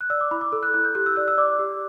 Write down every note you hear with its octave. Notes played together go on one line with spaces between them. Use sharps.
F#6
D5 E6
D6
E4 B5
D6
A4 E6
F#6
E4 F#6
G6
G4 F#6
E6
D5 F#6
E6
D5 D6
G4